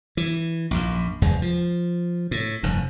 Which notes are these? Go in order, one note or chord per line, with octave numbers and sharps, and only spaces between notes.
E3
A#1 F#2
F1 E2 G#3
F3
A2
F1 G2